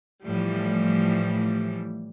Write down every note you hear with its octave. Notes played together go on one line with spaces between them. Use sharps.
A2 E3 F3 G3